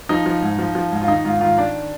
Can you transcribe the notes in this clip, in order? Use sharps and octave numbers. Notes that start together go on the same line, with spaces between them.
F3 D#4
F3
G#2
F3
F3
G#2
F4
D#3 D#4
G#2 F4
D#3 F4
D#3 D4